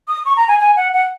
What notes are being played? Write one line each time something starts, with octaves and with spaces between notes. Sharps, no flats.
D#6
C#6
A#5
G#5
G#5
F#5
F#5